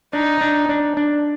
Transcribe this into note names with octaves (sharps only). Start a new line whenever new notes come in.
D4 D#4
D4
D4
D4